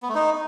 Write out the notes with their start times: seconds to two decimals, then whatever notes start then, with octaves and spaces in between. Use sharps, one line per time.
0.03 B3
0.09 A3
0.15 D#4